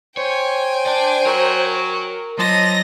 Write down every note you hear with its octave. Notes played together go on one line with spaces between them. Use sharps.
C5 C#5 G5 G#5
D5 A5
F#3 A#4
F3 F#3 D#5 A#6